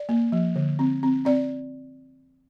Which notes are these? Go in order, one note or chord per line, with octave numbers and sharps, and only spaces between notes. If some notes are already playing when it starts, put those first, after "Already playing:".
Already playing: D5
A#3
F3
D3
C4
C4
C4 D5